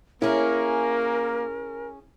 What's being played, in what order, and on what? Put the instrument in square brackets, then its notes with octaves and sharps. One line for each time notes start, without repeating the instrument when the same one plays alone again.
[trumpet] A#3 [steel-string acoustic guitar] C#4 G#4 [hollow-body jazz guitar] E4 [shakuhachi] A#4